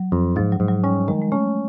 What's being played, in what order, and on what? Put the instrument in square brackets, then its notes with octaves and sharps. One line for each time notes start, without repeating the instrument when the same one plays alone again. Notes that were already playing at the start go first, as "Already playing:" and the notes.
Already playing: [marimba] F#3
[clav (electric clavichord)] F2
[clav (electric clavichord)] G#2 [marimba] F3
[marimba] F#3
[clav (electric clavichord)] G#2
[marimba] F#3
[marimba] G3 [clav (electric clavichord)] C#4
[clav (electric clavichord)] D#3 [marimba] G#3
[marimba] G#3
[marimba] A3 [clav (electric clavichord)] C#4